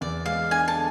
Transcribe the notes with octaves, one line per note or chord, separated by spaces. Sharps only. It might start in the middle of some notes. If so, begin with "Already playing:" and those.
E2 D5
G#3 F5
D4 G#5
A5
D3